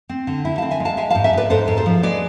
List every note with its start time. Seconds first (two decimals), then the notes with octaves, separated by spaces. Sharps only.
0.09 C4
0.27 D3
0.45 E4
0.58 F5 A5
0.62 C4
0.71 E5 G#5
0.80 G#3
0.85 F5 A5
0.97 G#3 E5 G#5
1.10 F5 A5
1.15 G#2
1.24 E5 G#5
1.33 G#2 B4 D5
1.50 G#2 A4 C5
1.68 G#2
1.77 A4 C5
1.86 F3
2.03 G#3 B4 D5